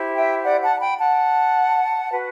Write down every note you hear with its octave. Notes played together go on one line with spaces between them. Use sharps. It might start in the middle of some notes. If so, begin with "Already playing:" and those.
Already playing: E4 G4 C5
E5 G5
D5 F#5
F#5 A5
A5
G5 B5
F#5 A5
F#4 B4